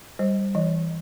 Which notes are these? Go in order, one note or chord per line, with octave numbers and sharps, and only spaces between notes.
G3 C5
E3 D#5